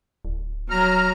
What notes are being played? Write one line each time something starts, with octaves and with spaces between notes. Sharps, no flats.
D1
F#3 A#5 F6